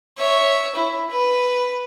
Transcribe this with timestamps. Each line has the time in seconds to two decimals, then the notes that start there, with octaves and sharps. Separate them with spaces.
0.18 C#5 E5
0.75 E4
1.10 B4